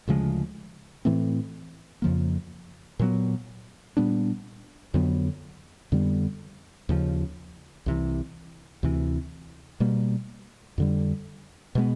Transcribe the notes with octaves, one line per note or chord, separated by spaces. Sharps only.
D2 C#3 F3 G#3
A2 E3 A3 C4
F2 C#3 F3 A#3
A#2 F#3 B3
A#2 G3 B3 D4
F2 D3 F#3 B3
F2 D3 G3 B3
D#2 C#3 F3
C2 C3 E3
D2 C3 E3
B2 G3 A#3
F2 D3 G3
B2 G#3 B3